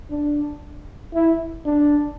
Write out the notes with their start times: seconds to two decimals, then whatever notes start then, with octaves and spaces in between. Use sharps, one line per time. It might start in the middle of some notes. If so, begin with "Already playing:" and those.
0.11 D4
1.14 E4
1.66 D4